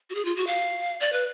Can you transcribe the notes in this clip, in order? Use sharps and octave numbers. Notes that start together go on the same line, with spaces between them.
F#4
G#4
F4
F#4
F5
D5
B4